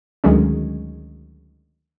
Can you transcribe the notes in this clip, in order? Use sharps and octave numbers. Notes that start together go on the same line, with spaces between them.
D2 D#3 F#3 G#3 C#4